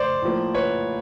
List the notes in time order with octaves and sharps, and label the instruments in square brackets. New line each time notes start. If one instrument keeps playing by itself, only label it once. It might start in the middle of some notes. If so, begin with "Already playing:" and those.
Already playing: [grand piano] C5 D5
A2 F3 A#3
B4 C#5